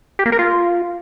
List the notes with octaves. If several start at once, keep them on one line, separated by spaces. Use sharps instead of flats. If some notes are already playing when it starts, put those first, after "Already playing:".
G4
A#3
A#4
F4